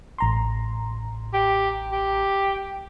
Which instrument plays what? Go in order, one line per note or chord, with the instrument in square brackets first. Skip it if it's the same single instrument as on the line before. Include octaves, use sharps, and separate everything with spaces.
[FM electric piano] A1 A#5 C6
[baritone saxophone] G4
G4